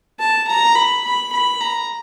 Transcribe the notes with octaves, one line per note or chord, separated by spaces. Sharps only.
A5
A#5
B5
B5
B5
A#5